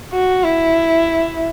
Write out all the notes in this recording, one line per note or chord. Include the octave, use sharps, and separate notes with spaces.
F#4
E4